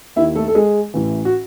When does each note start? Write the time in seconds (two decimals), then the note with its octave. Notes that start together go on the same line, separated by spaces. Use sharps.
0.16 D#2 D#3 E4 E5
0.35 A3 A4
0.48 A4
0.55 G#3 G#4
0.94 A1 A2 E3
1.25 F#4